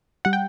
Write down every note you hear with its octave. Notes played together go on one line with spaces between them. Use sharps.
G3 F#5
G5